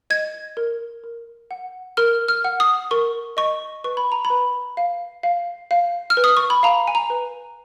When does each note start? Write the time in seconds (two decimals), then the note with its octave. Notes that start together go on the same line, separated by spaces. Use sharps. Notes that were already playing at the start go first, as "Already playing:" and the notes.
0.10 D#5 G#6
0.57 A#4
1.04 A#4
1.51 F#5
1.97 A#4 F6
2.28 F6
2.44 F#5
2.60 D#6
2.91 A#4 C#6
3.37 D#5 C#6
3.84 B4 C#6
3.97 B5
4.12 A#5
4.25 B5
4.30 B4
4.77 F5
5.23 F5
5.71 F5
6.10 F6
6.17 B4
6.24 D#6
6.37 C#6
6.50 B5
6.63 F5 A#5
6.87 G#5
6.95 A#5
7.10 B4